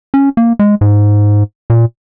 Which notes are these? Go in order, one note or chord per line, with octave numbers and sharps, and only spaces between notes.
C#4
A#3
G#3
G#2
A#2